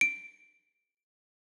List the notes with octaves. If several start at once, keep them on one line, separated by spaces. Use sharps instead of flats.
D7